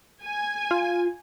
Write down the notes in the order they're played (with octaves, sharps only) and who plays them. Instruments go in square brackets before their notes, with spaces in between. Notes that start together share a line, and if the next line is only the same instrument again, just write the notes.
[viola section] G#5
[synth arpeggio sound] F4